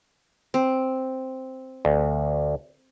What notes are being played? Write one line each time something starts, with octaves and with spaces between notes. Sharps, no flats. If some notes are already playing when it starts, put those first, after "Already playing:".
C4
D2